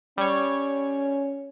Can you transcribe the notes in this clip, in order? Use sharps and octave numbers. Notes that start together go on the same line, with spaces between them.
G3 C#4 C#5